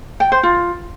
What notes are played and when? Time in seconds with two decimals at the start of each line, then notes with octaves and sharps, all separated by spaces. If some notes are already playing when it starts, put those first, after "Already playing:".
0.20 G5
0.32 C5
0.43 F4